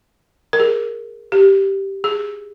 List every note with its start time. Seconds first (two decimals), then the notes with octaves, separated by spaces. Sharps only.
0.53 A#4
0.60 G#4
1.32 G4
2.04 G#4